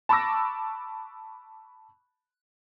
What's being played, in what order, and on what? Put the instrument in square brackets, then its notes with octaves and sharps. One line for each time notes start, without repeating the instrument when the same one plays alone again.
[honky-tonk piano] A5 B5 C#6 D6 E6 A#6